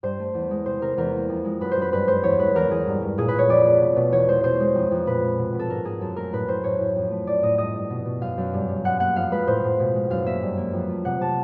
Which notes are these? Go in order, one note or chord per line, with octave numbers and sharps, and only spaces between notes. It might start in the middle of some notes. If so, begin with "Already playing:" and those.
G2 C5
A3
E2
G#3
C3 C5
C3 A#4
E2 A#4
A#3
F2
G#3
F#2 B4
C5
F#2
B4
G2 B4
G#3 C5
E2 C#5
G#3 B4
E2 A#4
E2 G#4
G2
G2
A#2 G#4
B4
A#2
C#5
F2 D5
A3
B2
B2
E2 C#5
G#3 C5
B2 C5
G#3
F2
F2
A#2 B4
A#2
B2
B2
A4
G#2 A#4
G#2 G#4
F#2 A4
A3 A#4
A2 B4
A2 C5
A2 C#5
A2
F2
A3
A2 D5
A2 D#5
G2 D#5
G2
B2
B2
F#2 F5
F#2
G2
G2
F#2 F#5
A#3 F#5
F2 F5
G#3 B4
A2 C5
A2
B2
G#3
F#2 F5
A#3 E5
G2
A#3
F2
A3
C3 F#5
C3 A5